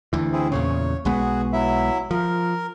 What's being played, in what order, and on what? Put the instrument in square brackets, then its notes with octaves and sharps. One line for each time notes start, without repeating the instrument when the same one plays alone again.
[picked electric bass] D2 E3
[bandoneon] C4 E4 G#4
[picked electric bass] E2 A#2 C#3 [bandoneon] C#5
[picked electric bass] B1 G#3 B3 [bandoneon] F#4 G#4
[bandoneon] F#3 E4 E5
[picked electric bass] F3 [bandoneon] A#4